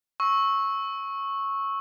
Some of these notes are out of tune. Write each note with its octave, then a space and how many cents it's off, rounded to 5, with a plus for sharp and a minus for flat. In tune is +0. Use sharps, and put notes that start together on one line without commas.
C#6 -10 E6 -15